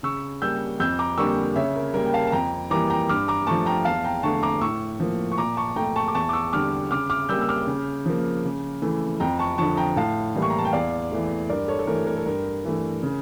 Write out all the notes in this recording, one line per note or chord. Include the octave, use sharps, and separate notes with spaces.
C#3 C#6 E6
G3 A#3 E6 G6
F2 E6 G6
A#5 D6
D3 G3 A#3 C#6 E6
C#3 C#5 E5
A#4
G3 A#3 A#4
G5
F5 A5
A5
F2 G5 A#5
E3 G3 A#3 A#5 D6
G5 A#5
G2 D6 F6
A#5 D6
F3 A3 A5 C#6
G5 A#5
E2 F5 A5
G5 A#5
D3 A3 A5 C#6
A#5 D6
A2 C#6 E6
F3 A#3
C#6
A#2 A#5 D6
A5 C#6
A3 G5 A#5
A5 C#6
D6
E2 A5 C#6
D6
C#6 E6
D3 G3 D6 F6
C#3 D6 F6
D6 F6
G3 A#3 E6 G6
E6
D6 F6
C#3
F3 A#3
C#3
E3 A3
F2 G5 A#5
A5 C#6
D3 F3 A5 C#6
G5 A#5
A2 F5 A5
E3 G3 A#3
C#6
A#5
A5
G5
E2 D5 F5
E3 A3
G2 A#4 D5
A4 C#5
A4
E3 A3 A#4
A#4
A4
G2 A#4
E3 A3
C#3